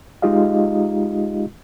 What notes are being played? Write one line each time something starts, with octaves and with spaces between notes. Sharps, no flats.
G#3 D#4 F4 G4 D#5 F5